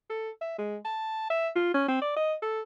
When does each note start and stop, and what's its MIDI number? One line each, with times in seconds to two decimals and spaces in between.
0.10 0.30 69
0.41 0.56 76
0.58 0.77 56
0.85 1.28 81
1.30 1.49 76
1.56 1.73 65
1.74 1.88 61
1.88 1.97 60
2.02 2.14 74
2.16 2.34 75
2.43 2.61 69